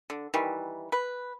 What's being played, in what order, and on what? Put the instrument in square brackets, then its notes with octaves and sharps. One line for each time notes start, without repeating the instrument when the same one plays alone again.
[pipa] D3
D#3 E3 G3
B4